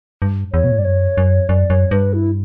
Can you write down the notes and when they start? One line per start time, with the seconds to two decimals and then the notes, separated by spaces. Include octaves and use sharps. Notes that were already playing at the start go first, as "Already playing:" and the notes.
0.22 G2
0.53 E2 C#5
0.64 B2
0.72 A2
0.78 G2 D5
0.85 F#2 C#5
1.17 F#2
1.49 F#2 D5
1.70 F#2 C#5
1.91 G2 B4
2.14 E4